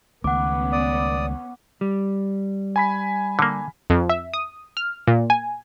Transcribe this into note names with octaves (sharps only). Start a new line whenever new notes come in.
C#2 D#3 A3 B3 C#4 F#5 D6
D5 D#6
G3
G#5 B5 B6
D3 A#3
F2
E5
D#6
F6
A#2
G#5